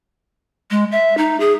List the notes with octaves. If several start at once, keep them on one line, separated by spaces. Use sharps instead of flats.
G#3
E5
D#4
G#4